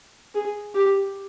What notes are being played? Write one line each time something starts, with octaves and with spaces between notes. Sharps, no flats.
G#4
G4